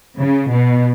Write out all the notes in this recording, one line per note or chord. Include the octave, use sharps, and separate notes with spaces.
C#3
B2